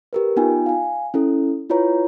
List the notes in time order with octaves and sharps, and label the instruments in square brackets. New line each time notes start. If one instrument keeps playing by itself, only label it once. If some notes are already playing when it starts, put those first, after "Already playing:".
[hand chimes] G4 A#4 B4
B3 D#4 F4 G5 G#5
F5 G#5
C#4 E4 A4
E4 F4 B4 C#5 A#5